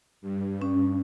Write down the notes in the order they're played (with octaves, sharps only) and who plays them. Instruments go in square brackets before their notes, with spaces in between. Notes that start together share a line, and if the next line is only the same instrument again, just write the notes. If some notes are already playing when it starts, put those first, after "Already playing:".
[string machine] G2
[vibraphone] C#4